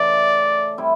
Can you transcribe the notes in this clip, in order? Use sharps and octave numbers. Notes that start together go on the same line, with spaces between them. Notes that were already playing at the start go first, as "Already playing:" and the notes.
Already playing: C#3 E3 A3 D5
G3 C4 E4